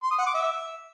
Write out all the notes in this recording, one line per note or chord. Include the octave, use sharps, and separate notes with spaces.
C6
D#6
F#5
D6
E5